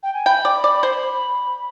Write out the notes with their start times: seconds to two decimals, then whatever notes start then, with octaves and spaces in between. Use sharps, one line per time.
0.03 G5
0.14 G#5
0.26 G5 B5
0.45 D5
0.64 D5
0.83 C5